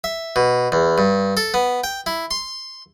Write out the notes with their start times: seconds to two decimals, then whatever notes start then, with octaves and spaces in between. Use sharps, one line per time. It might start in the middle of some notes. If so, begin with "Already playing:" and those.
0.04 E5
0.36 B2
0.72 E2
0.98 G2
1.37 A4
1.54 B3
1.84 G5
2.06 E4
2.31 C6